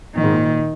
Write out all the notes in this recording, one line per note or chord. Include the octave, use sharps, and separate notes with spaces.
A#2 D#3
G#2
A#2